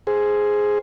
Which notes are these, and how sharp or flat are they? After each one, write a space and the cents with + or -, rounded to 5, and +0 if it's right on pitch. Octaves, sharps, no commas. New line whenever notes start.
G#4 +0 C5 +0